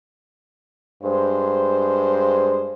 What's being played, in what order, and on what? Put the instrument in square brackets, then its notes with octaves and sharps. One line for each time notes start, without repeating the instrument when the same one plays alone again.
[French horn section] G2 G#3 C5